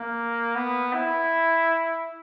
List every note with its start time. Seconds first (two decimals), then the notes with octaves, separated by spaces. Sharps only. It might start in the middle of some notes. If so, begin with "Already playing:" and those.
Already playing: A#3
0.55 B3
0.94 E4